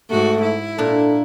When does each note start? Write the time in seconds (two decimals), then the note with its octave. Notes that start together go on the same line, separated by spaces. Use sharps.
0.11 G#2 A3 F#4
0.42 E4
0.78 A#2 A#3 D4 A4